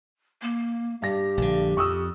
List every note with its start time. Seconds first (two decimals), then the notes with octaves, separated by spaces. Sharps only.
0.42 A#3
1.02 G2 G4 A#6
1.37 A#1 D3
1.77 F2 C#6 D#6 E6